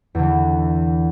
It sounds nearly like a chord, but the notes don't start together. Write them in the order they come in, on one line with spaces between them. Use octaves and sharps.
E2 D3 E3